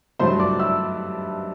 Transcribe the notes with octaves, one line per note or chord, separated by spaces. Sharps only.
G2 F#3 A3 C5 C6
D5 D6
E5 E6